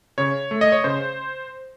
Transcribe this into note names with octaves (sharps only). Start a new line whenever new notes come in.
C#3 C#5
A3
D#5
C#5
C#3 C5